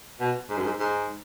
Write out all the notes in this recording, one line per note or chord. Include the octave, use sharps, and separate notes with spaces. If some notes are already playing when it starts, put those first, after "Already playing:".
B2
G#2
F#2
G#2
G#2